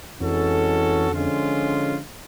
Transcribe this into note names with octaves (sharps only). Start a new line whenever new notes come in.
F2 E3 G#3 C#4 F#4 A4
D3 F3 G#3 C#4 F4